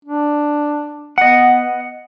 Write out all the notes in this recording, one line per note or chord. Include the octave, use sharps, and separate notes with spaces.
D4
B3 D#5 F#5